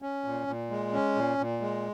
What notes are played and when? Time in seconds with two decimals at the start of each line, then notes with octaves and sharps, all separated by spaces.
0.02 C#4
0.24 A#2
0.47 A#2
0.70 G#3
0.93 C#4
1.15 A#2
1.38 A#2
1.61 G#3